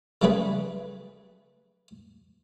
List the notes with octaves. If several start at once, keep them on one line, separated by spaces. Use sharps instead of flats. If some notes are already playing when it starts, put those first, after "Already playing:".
C#3 F#3 G3 A3 G#4 B4